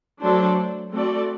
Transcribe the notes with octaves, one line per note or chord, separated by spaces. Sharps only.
F#3 A3 D4 A4 C5
A3 C4 F#4 A4 D5